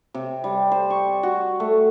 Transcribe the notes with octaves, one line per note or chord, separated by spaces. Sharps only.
C3
G3
C5
C#6
F#4
A3